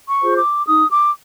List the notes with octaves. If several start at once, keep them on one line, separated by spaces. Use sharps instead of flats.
C#6
F4 G#4 C5
D6
D#4 D#6
D6